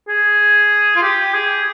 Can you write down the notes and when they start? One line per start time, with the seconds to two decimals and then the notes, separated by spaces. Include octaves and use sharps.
0.08 G#4
0.96 F4
1.02 G4
1.34 G#4